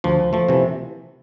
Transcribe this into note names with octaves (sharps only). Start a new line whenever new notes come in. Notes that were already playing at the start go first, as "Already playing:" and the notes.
D2 F3
F3 A3
C3 E3